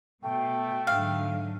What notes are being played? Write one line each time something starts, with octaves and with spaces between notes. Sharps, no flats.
B2 A3 G5
G#2 D3 F#3 F5